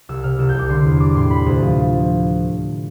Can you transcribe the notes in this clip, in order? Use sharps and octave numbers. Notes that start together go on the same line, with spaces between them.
C2 E6
C3 F6
C2 E6
G6
C2 D6
D3 C6
E2
G3 D6
A2 C6
C3 B5
D2
F3
F3